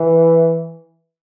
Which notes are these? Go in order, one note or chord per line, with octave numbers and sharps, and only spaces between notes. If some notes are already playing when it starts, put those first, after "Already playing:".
Already playing: E3